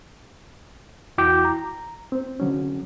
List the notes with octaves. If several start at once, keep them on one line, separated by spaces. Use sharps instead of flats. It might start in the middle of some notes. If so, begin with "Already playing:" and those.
E2 E4 F#4 G5 D6 G6
A#5
C4
D3 F#3 C#4